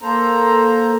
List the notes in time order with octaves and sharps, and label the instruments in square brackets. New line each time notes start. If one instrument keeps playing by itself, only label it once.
[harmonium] A#3 A4 C5 A#5